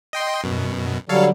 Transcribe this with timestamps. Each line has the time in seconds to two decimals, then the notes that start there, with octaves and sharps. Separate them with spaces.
0.13 D#5 G5 C6
0.44 F#2 B2
1.09 D3 F#3 G3 A4 C#5 F5